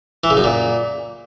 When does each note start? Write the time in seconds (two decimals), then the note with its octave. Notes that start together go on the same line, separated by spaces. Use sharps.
0.24 E3
0.30 C#3
0.37 F#2
0.44 A#2